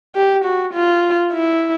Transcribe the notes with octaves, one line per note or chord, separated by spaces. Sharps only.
G4
F#4
F4
E4